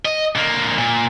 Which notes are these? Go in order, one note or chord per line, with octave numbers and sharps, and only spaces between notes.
D#5
D3 A#3
A#2